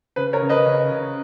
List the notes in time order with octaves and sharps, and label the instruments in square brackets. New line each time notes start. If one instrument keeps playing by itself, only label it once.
[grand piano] C#3 [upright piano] B4
[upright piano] A#4 C#5
[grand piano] C#3
[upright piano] B4 D#5
[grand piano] C#3
C#3